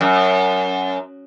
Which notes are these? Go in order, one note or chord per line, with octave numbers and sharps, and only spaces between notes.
F#2